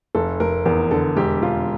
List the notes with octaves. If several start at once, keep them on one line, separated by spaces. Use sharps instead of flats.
F1 A4
F1 A#4
E2 A#4
D3 A4
E1 G4
E1 F4